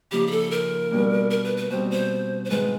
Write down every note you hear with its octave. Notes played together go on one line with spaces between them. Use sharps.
C#3 F3 A#3 D#4 G4
G#4
A4
A#4
B2 G3 A#3 D4
A#4
B4
B4
B2 G3 C4 C5
C5
C5
G#2 D#3 G#3 B4